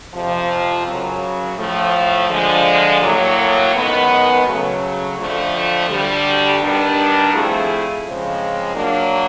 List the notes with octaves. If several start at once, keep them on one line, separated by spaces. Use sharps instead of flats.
F2 C3 F3
F#2 C#3 F#3
A2 F3 A3
D3 F3 G#3
A2 F#3 A#3
F#2 D#3 G#3 B3
C#3 F#3 A3
F2 D3 F3 A3
D2 D3 G3
D#3 G3 B3 D4
F3 A3 C4 E4 G#4
C#3 F3 G#3 C4
F#3 A#3 D4